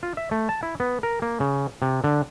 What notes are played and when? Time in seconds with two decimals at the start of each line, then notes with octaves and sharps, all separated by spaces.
0.03 F4
0.17 E5
0.31 A3
0.49 A5
0.63 E4
0.80 B3
1.03 A#4
1.22 A#3
1.40 C#3
1.82 C3
2.04 D3